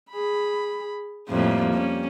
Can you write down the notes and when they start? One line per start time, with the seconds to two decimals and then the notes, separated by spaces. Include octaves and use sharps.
0.10 G#4 B5
1.29 F2 A2 G3 A#3
1.75 C#4